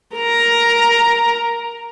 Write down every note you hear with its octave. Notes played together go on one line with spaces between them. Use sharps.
A#4 A#5